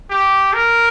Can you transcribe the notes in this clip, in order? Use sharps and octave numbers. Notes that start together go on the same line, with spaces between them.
G4
A#4